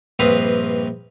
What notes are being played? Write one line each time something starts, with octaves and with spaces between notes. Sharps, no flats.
A#1 G2 C4 B4 F5 D#6